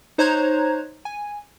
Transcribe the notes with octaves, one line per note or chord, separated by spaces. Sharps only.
D#4 C5 C#5 A#5 F#6 G#6
G#5